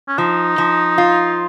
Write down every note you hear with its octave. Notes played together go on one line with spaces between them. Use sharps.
C#4
F3 D#4
F3
F4